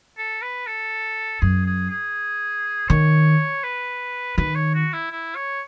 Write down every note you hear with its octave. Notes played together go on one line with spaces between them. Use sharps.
A4
B4
A4
F#2 G#4
G#4
G#4
D#3 C#5
B4
D#3 B4
C#5
F#4
E4
E4
C#5